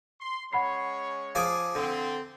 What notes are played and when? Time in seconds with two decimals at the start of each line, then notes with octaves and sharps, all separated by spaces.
0.19 C6
0.53 G#3 C#4 C#5 F#5 B5 C7
1.35 F3 G#4 F5 D6 D#6
1.75 D3 C4